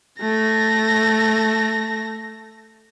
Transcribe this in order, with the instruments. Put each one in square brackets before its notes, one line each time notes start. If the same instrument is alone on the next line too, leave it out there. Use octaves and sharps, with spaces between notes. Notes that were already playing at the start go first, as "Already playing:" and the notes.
[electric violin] A3 A#6